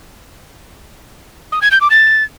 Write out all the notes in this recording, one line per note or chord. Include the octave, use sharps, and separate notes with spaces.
D#6
G#6
G6
D6
A6